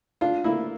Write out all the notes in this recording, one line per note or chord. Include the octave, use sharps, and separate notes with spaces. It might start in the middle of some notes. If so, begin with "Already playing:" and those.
D4 F4
A#3 E4